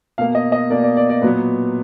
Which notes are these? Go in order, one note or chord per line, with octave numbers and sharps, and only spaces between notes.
B2 A#3 F5
D#5
D#5
B2 A#3 D5
D5
D5
D5
A#2 F#3 B3 B4